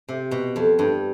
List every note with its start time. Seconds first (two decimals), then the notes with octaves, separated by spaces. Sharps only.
0.09 C3
0.31 B2
0.56 F2
0.79 G2